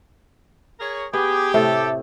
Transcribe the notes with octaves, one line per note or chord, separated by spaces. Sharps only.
G#4 A#4 C#5
B3 G4 G#4
A2 C3 A3 A4